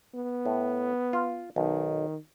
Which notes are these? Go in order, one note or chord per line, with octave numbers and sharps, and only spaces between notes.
B3
A2
F4
B1 D#3